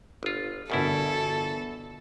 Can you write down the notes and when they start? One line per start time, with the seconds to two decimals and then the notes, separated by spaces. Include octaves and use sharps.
0.23 G1 F4
0.70 G1 E2 B2 E4 F#4 A4 A#4